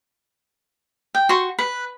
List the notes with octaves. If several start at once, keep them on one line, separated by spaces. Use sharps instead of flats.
G5
F#4 C6 C#6
B4